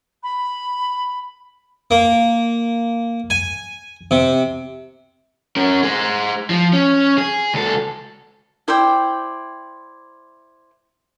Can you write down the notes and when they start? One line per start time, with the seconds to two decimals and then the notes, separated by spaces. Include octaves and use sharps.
0.23 B5
1.91 A#3
3.30 G#5
4.11 C3
5.56 C#4 A#4
5.83 G#4 C5
6.50 F3
6.73 C#4
7.18 G#4
7.54 C#2 A4
8.68 E4 C5 D5 G5